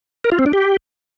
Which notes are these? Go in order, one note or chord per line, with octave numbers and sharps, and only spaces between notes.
A#4
F4
C4
D4
G4